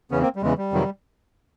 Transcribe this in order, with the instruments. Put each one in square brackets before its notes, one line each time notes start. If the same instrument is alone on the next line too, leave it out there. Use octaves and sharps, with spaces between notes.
[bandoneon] E2 C#3 E3 B3 C#4
A#3 C4
G3
E2 C#3 E3 G#3
G3
F2 C3 D#3 F#3